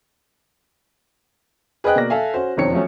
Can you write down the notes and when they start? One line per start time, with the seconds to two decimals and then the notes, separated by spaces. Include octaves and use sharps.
1.84 G#4 B4 C5 D#5 G5 F#6
1.96 B2 A#3 D5 A#6
2.10 A4 E5 F5 G#5
2.34 C#4 F#4 C5
2.57 E1 F2 D#3 C4 C#5 C#7
2.73 F3 F#3 A3 C#4